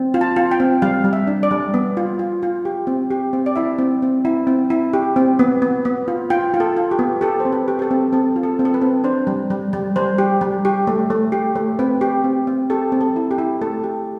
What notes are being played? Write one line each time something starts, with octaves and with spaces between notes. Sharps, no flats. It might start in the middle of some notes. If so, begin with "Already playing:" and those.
Already playing: C4
F4
A5
F4
G5
C4
G3 F5
G3
E5
D4
D5
G3
B3
F4
F4
F4
G4
C4
G4
C4
D5
E4 E5
C4
C4
E4
C4
E4
G4
C4
B3
B3
B3
F4
F4 G5
F4
A4
F4
G4
B3
G4 A4
C5
C4
B4
G4
G4
A4
C4
C4 A4
F4
A4
C4
A4
B4
C4
D4 C5
G3
G3
G3
G3 C5
G4
G3
G4
A3
A3
G4
A3
C4 B4
G4
C4
C4
G4 A4
C4
A4
E4
G4
E4
A3 A4
G4